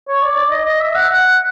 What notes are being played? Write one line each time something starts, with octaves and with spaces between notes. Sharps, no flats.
C#5
D5
D5
D#5
D#5
E5
F#5
F#5